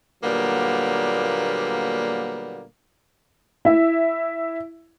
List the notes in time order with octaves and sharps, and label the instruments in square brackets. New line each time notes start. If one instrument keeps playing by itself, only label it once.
[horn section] A#2 D3 F#3 G3 A#3 B3
[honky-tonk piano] E4 E5